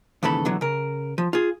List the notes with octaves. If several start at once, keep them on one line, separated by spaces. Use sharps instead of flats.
D#2 G#2 C#3 E3 A4 B5
B2 D3 E3 F#3
C#3 A#4
F3
F4 G#4